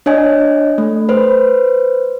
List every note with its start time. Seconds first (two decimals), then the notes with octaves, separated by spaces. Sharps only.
0.06 D4 C#5 D#5 G#5
0.78 A3
1.09 B4 C5